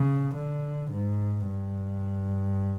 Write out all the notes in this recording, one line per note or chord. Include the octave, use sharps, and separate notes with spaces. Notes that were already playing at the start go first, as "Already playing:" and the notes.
Already playing: C#3
D3
G#2
G2